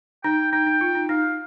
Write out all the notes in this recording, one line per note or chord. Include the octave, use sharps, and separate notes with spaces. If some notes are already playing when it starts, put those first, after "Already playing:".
D#4 G5
D#4 G5
D#4
F4
D#4
D#4 F5